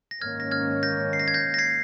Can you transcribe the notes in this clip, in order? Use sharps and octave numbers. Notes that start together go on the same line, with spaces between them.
A#6
G#2 D#3 A#3 C#4 F6 G#6
A#6
F6 G#6
G6 A#6
C7
A#6
G#6
G6 A#6
A#6
G#6 C7